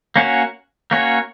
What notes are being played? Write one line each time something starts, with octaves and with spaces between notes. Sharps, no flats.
A#3 C#4 F#4 C#5
A#3 C#4 F#4 C#5